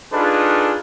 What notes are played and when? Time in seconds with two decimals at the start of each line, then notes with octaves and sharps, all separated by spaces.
0.12 D4 D#4 F4 G#4 A4 B4